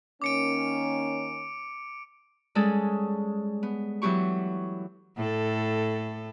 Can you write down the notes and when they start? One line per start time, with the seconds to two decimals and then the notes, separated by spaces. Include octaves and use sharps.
0.22 D#3 A#3 C#4 D6 C#7 D7
2.55 G3 G#3 C#4 G#4 A4
3.63 B3
4.02 E3 F#3 B3 G4 C#6
5.17 A2 A4